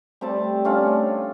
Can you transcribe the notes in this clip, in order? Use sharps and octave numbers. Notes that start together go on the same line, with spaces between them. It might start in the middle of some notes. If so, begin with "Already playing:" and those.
G3 A3 C4 A5
A3 C#4 D4 F4